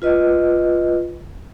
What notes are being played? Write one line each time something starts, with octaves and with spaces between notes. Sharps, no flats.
F4 B4 D#5